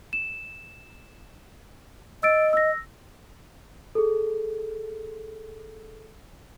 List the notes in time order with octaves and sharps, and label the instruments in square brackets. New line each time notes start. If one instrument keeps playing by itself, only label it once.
[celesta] E7
[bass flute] D#5 [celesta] E6 A6 D7
[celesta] E6 A#6
G#4 A4